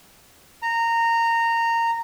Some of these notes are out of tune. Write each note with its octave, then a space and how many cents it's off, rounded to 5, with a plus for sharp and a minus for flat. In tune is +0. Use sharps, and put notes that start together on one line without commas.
A#5 -15